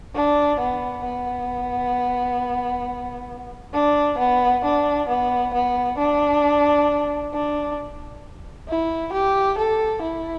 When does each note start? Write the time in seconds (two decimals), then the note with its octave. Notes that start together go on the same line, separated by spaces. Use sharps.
0.15 D4
0.60 B3
1.04 B3
3.74 D4
4.19 B3
4.64 D4
5.09 B3
5.53 B3
5.98 D4
7.34 D4
8.68 E4
9.13 G4
9.58 A4
10.02 E4